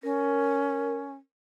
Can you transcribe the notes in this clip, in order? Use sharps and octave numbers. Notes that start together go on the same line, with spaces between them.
C#4 A#4